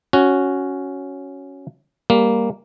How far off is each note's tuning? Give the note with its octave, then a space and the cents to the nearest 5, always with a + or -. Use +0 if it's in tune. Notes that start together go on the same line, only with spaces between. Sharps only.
C#4 +0 F#4 +0
G3 +20 A#3 +0